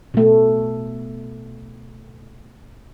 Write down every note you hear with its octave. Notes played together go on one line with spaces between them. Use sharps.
B2 A3